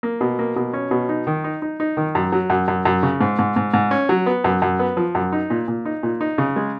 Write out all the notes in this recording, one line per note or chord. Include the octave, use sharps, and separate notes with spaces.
A#3
B2
A#3
B2
C#4
B2
D#4
D#3
D#4
D#4
D#4
D#3
F#2
F#3
F#2
F#2
F#2
C#3
G#2
G#2
G#2
G#2
C#4
F#3
B3
F#2
F#2
B3
F3
F#2
D#4
A#2
A#2
D#4
A#2
D#4
C#3
G#3